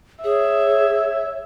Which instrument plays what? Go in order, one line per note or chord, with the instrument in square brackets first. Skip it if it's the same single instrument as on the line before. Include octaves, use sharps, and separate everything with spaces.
[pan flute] G#4 [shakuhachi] C#5 [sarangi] E5